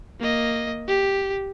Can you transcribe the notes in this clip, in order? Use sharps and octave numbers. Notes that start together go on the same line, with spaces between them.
A#3 D#5
G4